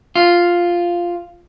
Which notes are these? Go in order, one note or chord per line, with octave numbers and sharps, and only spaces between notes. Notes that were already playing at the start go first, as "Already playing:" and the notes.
F4